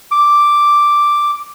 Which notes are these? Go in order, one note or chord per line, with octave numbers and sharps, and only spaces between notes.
D6